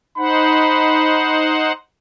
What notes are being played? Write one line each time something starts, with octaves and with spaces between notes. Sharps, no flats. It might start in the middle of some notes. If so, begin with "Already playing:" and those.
D#4 C5 F#5 B5